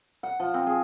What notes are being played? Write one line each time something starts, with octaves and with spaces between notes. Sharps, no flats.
F#5
F3
C4
G#4